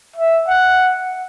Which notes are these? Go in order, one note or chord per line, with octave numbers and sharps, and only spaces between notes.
E5
F#5